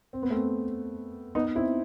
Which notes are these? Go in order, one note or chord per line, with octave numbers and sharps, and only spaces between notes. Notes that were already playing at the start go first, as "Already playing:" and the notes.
C4
B3
A3 C4
B3 D#4
C4 E4